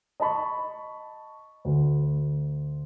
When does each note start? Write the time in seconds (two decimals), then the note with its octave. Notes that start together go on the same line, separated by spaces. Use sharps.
0.20 D#5 A5 B5 C#6
1.65 D2